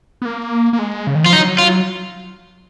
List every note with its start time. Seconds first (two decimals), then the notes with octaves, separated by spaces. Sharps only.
0.22 B3
0.25 A#3
0.73 A#3
0.79 G#3
1.07 C#3
1.15 D#3
1.24 F3 F4
1.33 F#3 D#4
1.59 F4